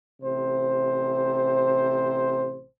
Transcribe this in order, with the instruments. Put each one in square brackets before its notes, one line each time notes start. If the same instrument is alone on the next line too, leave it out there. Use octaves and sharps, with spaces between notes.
[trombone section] A1 C3 C5